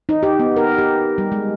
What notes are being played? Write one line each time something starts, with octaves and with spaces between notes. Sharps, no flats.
D#4
G4
B3
A#4
G4
G3
G#3